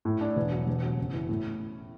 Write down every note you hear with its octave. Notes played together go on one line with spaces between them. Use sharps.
A2
D4
E1
F#3
E1
F#3
F#1
E3
A2